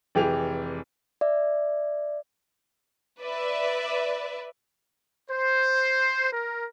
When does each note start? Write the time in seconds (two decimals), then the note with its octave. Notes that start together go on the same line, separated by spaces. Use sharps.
0.15 F1 E3 G4 G#4 F7
1.21 D5 E5
3.20 B4 D5 E5
5.31 C5
6.31 A#4